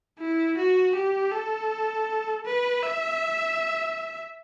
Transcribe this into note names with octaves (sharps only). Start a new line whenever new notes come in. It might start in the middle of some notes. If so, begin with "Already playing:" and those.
E4
F#4
G4
A4
B4
E5